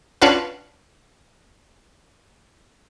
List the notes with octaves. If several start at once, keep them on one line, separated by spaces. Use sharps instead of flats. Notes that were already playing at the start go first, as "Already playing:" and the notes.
C#4 D4 F4 F#4 B4